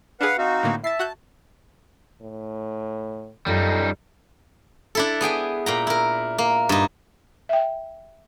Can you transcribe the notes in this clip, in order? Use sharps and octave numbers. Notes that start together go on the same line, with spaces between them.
D4 G#4 B4 F5 F#5
C4 D#4 F#4 F5
A2 D3 A#3
E5 A5 A6 C7
F#4 F#6 G6
A2
F#2 G3 C#4 D#4 F4 A4
D4 E4 A4
B3 G#4 G5 G#5
A#2 G5 A#5
E4 A#4
A#3
G2 D#4
E5 G5